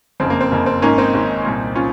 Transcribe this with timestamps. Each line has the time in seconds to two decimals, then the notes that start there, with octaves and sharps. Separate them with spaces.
0.20 F#1 F2 C#3 C4
0.30 A#3
0.41 C4
0.51 F#1 F2 C#3 A#3
0.66 C4
0.82 G#1 G#2 D#3 A#3 C#4
0.98 C4 D#4
1.13 G#1 G#2 D#3
1.45 C2 A#2
1.75 C#4 F4